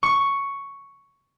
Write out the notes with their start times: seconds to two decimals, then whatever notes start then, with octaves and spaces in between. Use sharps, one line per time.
0.03 C#6